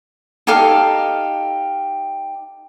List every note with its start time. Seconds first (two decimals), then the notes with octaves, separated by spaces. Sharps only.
0.47 D#4 G4 A4 F5